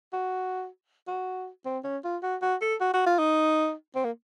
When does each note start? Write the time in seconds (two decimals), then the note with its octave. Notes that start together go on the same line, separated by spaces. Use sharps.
0.13 F#4
1.08 F#4
1.65 C4
1.84 C#4
2.04 F4
2.23 F#4
2.42 F#4
2.62 A4
2.81 F#4
2.94 F#4
3.07 F4
3.19 D#4
3.95 C4
4.04 A#3